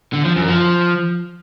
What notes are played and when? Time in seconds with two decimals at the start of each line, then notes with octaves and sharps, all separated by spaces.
0.14 D3
0.25 F3
0.36 F#2
0.48 F3